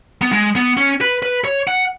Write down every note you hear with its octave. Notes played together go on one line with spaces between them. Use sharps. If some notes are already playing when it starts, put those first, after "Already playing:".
B3
G#3
B3
C#4
B4
B4
C#5
F#5